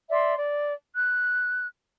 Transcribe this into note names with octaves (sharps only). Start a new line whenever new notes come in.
D5 E5 C6
D5
F#6